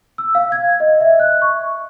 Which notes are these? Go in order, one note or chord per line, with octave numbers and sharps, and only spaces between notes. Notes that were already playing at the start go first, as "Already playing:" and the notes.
E6
F5
G#6
D#5
E5
F#6
C#6